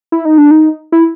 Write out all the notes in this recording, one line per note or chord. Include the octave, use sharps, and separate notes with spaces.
E4
D#4
D4
D#4
E4